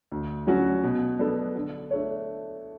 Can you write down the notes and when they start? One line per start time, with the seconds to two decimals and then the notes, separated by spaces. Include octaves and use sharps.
0.12 D2
0.46 D3 F#3 C#4 F#4
0.84 B2
1.19 F#3 B3 D4 A4
1.55 D3
1.90 A3 D4 A4 C#5